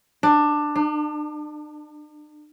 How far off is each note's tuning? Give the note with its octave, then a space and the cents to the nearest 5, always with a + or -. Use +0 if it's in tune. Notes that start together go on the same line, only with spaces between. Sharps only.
D4 +15
D4 +45